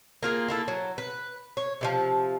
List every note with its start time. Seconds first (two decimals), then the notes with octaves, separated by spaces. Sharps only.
0.23 A#3 F4 G#4
0.48 A#3 E4 A4
0.68 F#3
0.98 B4
1.57 C#5
1.81 C3 D#3 F3